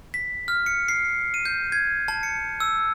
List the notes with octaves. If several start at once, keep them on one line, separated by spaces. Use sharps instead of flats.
B6
F6
C#7
C7
D#7
G6
G#6
A5
C#7
E6